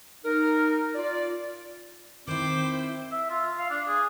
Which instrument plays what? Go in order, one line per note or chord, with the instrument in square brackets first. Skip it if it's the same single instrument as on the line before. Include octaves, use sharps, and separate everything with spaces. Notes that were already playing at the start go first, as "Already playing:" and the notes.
[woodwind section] D#4 A#4
F4 D5
[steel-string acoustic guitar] D#3 E4 [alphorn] C4 [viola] C5 [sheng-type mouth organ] D6
[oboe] E5
F4
F5
D4
G#4